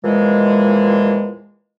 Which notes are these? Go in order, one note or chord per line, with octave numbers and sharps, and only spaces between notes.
E2 A#2 E3 F3 G#3